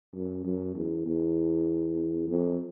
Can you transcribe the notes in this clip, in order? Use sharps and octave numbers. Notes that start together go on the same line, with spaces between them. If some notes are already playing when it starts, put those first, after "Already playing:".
F#2
F#2
E2
E2
F2